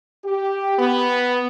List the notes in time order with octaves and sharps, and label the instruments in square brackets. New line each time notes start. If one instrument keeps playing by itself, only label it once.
[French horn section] G4
B3